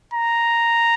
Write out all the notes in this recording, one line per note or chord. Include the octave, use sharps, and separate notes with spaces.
A#5